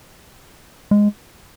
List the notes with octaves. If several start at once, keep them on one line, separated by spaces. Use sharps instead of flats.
G#3